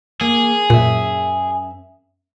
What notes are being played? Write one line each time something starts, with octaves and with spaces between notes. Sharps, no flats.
A#3 G#4
F#2 A#2 E5